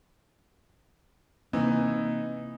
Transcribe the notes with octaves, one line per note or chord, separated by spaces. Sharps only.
C3 E3 A#3 C4 D#4